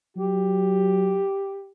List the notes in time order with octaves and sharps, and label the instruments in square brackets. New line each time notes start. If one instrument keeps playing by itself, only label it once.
[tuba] F#3 [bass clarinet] G4